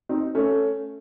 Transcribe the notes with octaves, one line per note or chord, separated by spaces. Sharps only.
C4 D#4
A3 C#4